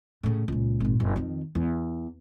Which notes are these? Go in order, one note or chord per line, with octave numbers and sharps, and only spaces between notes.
A2 C#3
C#2 A#2
G#1 A#2
F#1
F2 D#3
E2